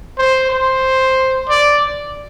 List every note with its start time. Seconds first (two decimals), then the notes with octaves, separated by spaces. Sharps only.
0.18 C5
0.50 C5
1.49 D5